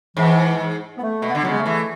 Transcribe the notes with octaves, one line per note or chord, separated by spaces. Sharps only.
G#2 E3
B3
A3
B2
B3
D3
C#3 F#3
G#3
A3
E3